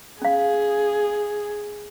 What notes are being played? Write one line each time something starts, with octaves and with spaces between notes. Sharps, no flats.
C#4 G#4 F5